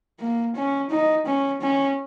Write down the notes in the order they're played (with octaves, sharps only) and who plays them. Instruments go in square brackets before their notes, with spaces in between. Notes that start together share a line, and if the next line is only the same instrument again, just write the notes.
[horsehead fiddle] A#3
C#4
D#4
C#4
C#4